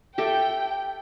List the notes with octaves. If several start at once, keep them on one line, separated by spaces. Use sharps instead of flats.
G4 A4 E5 G5